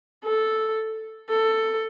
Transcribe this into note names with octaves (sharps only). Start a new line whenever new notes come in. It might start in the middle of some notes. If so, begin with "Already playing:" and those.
A4
A4